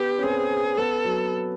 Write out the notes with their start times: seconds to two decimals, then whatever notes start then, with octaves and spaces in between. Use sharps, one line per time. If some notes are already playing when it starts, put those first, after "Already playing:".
Already playing: B3 G4
0.19 C#4
0.22 C4 G#4
0.77 B3 A4
1.05 F#3